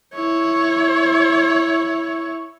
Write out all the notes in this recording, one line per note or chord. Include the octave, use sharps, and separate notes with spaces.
E4 C#5